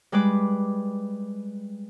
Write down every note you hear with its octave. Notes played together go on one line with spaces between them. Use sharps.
G3 G#3 B4 D6